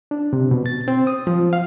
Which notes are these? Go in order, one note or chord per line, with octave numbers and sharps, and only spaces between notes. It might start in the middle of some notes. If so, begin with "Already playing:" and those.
D4
C3
B2
A6
C4
D#6
F3
F5